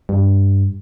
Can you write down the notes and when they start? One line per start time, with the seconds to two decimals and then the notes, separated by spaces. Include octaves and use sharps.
0.09 G2